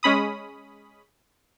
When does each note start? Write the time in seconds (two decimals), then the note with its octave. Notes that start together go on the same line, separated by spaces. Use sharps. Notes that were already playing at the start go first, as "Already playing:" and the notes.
0.03 G#3 C#4 B5 D#6